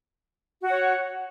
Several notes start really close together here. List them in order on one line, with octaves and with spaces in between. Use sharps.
F#4 F#5 C#5